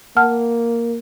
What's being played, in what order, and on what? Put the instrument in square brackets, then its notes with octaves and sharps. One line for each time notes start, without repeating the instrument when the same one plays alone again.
[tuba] A#3 [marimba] F#5 A5 F6